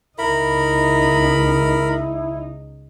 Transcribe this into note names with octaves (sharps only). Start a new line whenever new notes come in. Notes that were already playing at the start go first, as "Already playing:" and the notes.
C#2 D#4 E4 A#4 B5